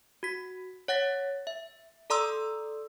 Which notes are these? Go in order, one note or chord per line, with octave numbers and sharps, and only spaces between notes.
F#4 B6
C#5 F#5 A6 A#6
E5
A4 D5 A#5 C6 D#6 E6